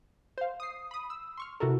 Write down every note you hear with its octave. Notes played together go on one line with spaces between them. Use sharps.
C5 F5
D#6 C7
B5 D#6
E6
C6 C#6 F6
C3 E4 F#4 A4 A#4